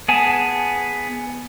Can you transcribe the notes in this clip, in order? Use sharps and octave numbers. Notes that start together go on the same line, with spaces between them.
B3 G#4 G#5 A5